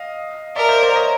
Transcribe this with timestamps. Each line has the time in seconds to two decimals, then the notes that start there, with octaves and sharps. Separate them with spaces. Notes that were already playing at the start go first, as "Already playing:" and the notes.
Already playing: D#5 F5
0.56 A#4 D5 E5
0.69 C5 D5
0.83 C5 D5
0.96 C#5 D#5